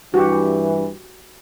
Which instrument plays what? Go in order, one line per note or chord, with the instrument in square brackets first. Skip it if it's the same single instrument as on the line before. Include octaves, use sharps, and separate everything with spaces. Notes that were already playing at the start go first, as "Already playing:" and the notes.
[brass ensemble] G2 E3 [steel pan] F#4 G4